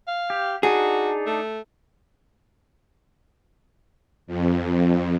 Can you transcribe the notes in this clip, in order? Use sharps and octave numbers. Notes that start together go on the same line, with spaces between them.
F5
G4
D4 D#4 F#4 G#4
A3
F2